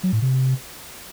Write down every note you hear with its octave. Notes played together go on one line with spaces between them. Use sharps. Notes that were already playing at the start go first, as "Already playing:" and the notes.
F#3
A2
C3